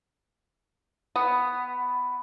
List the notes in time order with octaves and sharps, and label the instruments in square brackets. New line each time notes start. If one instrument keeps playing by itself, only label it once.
[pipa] B3